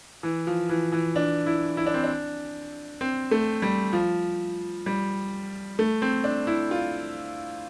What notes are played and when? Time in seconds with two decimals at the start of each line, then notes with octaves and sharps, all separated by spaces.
0.23 E3
0.47 F3
0.69 E3
0.93 E3
1.16 D4
1.46 E4
1.77 E4
1.86 D4
1.94 C4
2.04 D4
3.01 C4
3.31 A3
3.62 G3
3.93 F3
4.86 G3
5.79 A3
6.02 C4
6.24 D4
6.47 E4
6.71 F4